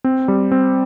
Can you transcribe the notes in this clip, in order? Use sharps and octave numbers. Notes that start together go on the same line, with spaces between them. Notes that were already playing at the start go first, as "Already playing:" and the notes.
C4
G3
C4